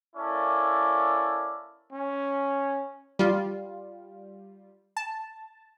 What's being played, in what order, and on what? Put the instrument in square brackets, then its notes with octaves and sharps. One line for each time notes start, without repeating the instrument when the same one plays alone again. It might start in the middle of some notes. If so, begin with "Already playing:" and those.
[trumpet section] A#3 C#4 E4 A4 D5
[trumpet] C#4
[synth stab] G3 F4
A5